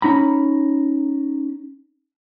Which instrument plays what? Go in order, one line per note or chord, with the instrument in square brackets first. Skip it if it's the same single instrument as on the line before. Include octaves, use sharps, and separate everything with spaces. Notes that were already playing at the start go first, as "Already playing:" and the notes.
[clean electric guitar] C#4 D#4 A#5 B5